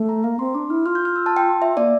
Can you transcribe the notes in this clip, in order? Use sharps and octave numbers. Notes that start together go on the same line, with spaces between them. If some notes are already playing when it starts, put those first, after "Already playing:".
Already playing: A3
A#5
A#3 A#5
C4 C6
D4 D6
E4 F6
F4 F6
G6
F6
E6
A5
G5
E5
A#3 D5